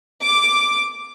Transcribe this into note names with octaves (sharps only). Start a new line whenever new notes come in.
D6